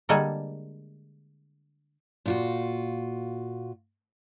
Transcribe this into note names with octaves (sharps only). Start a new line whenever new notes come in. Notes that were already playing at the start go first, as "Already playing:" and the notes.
D3 G3 G#3 A#3 A4 G#5
A#2 F4 F#4